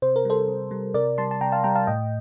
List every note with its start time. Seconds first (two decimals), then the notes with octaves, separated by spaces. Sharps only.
0.02 C3 C5
0.16 A#4
0.25 G3 A4 C5
0.48 C3
0.71 G3
0.94 C3 A#4 D5
1.18 G3 A5 C6
1.31 A5
1.41 C3 G5 A#5
1.52 F5 A5
1.64 G3 G5 A#5
1.75 F5 A5
1.87 A2 D#5 G5